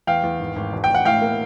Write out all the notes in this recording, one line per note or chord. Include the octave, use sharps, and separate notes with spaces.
E2 F5 G5
E2
G#1
G#1
E1
G5
E1
F#5
A2 F5 G5
A#3